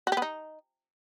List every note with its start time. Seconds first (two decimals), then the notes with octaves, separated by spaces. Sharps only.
0.07 F#4
0.12 G4
0.17 B3
0.22 D#4